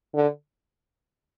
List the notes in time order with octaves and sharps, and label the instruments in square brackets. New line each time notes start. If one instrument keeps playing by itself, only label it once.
[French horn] D3